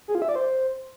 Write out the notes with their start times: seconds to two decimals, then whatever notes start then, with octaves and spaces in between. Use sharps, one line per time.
0.08 G#4
0.15 F4
0.22 E5
0.29 D5
0.36 C5